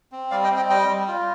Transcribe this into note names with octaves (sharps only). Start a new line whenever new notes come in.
C4
G3 D5 F5
D#5 G5
C4
D#5 G5
G3 D#5 G5
G3
F4